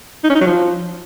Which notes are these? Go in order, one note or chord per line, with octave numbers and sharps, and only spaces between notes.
D#4
C#4
D#4
F#3
F3